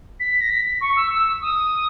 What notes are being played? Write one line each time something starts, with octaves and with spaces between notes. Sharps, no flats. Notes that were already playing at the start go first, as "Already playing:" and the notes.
B6
A#6
B6
C#6
E6
E6
D#6